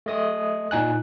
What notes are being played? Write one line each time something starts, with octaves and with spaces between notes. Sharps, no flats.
A3 D#5 D#6
A#2 D#4 G#5 F#6